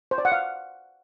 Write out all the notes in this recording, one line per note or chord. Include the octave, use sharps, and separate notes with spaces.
C5
D5
F#5
F5